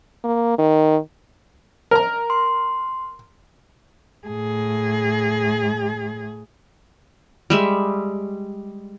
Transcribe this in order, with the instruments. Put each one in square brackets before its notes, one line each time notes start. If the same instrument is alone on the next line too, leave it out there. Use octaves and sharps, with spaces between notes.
[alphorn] A#3
D#3
[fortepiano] A#4 A#5
[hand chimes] C6
[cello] A2 G#4
[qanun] G3 G#3 E5